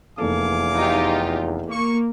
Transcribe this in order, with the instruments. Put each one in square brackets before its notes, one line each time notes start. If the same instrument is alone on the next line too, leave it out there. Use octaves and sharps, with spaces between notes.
[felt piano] F1 A#3 A4 [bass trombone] E2 [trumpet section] F5 G#5 D6
[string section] D#4 F4 G4
[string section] A#3 [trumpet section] C#6